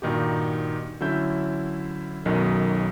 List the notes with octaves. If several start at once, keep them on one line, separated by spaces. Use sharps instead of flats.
G2 A#2 D#3 D#4 F#4 G4
D3 F#3 C#4 E4 E5 G6
B1 F#2 D#3 F#3 D#5